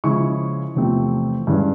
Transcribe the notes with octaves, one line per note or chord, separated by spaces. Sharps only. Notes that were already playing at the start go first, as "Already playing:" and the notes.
C#3 F3 G#3 C#4 E4 C#6
E2 C3 F3 A3 C4
G2 E3 G#3 C#4